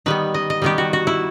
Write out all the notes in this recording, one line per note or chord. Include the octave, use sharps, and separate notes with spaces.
D#3 G3 B3 B4
D#5
D#5
D#3 G3 B3 G4
F#4
F#4
E4